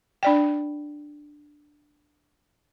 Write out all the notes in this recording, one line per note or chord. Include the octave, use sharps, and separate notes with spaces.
D4 D5 G5